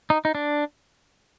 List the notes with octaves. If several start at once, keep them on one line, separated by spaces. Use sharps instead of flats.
D#4
D#4
D4